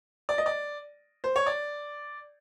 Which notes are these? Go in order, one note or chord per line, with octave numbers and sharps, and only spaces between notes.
D5
D#5
D5
C5
C#5
D5